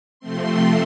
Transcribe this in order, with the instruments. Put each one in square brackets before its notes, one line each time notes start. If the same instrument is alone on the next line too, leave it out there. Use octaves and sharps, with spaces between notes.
[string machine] C3 F3 A3 C4 C6